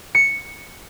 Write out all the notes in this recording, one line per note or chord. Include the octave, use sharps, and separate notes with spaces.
C#7